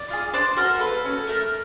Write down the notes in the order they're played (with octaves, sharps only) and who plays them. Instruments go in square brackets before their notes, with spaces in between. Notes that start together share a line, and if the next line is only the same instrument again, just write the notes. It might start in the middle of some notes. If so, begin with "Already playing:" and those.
Already playing: [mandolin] D5
F4 G#4
D4 C5 D5
F#4 A4 A#4 C5
A#3 A4 B4
C#4 F#4
A3 A#4